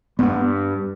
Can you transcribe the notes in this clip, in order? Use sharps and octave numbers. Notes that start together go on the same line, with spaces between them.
G2 B3